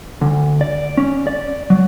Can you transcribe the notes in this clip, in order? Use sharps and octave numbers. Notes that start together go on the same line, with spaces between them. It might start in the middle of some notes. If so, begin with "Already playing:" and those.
D2
D5
C#4
D5
F#3